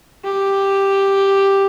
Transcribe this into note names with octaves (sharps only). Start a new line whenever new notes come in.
G4